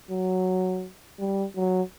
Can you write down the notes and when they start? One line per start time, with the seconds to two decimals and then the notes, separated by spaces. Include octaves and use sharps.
0.10 F#3
1.19 G3
1.56 F#3